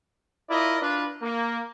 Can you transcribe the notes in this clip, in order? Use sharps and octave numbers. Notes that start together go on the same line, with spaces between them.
E4 F4 A#4 D5 D#5
D4 F4 B4
A#3